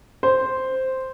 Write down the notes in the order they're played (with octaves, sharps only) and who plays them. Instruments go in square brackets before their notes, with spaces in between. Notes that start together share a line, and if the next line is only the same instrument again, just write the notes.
[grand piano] C5